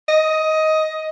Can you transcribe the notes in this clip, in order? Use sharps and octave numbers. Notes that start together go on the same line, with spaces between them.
D#5